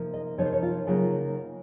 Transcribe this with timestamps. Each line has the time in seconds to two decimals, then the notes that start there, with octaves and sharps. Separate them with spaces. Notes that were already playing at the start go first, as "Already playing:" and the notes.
Already playing: C3 F3 A#3 D#4
0.13 D#5
0.37 C3 F3 A#3 D#4 C#5
0.46 C5
0.53 C#5
0.63 F4
0.87 C#3 F#3 A#3 D#4 F4